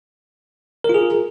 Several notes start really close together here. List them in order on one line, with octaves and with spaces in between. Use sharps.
A#4 F4 G#4